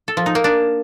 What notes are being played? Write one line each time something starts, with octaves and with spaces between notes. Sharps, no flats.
A4
F3
D#4
A#3
D4